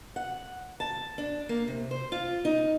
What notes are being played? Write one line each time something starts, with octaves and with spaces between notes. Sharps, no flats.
F#5
A5
D4
A#3
C3
C5
F4
D#4